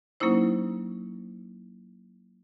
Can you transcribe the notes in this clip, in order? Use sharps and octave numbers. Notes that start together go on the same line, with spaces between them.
F#3 A#3 C#4 D#4 E4 C5